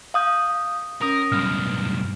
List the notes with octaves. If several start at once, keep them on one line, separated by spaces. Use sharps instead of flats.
F5 D#6 G6
C#4 A#4 D#6 A#6
B1 G2 F6